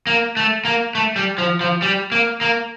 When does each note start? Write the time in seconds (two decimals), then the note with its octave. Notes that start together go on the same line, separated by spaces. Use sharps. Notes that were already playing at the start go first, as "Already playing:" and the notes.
0.07 A#3
0.37 A3
0.65 A#3
0.95 A3
1.16 G3
1.38 F3
1.61 F3
1.82 G3
2.12 A#3
2.41 A#3